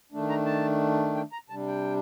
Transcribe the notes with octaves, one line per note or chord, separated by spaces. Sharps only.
D#3 A3 D4
A#5
A5
G5
A#5
C3 G3 D4 A5
G5